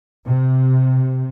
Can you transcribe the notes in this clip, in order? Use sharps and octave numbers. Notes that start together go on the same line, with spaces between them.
C3